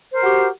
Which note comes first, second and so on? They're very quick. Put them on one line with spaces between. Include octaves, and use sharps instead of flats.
C5 A#4 F#4 G4